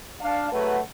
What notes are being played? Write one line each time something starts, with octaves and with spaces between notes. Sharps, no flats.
D4 F5 A5
F#3 A3 G#4 B4 F#5